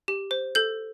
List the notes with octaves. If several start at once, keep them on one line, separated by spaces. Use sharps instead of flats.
G4
C5
A4 G6